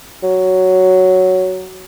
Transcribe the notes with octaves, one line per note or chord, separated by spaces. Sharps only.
F#3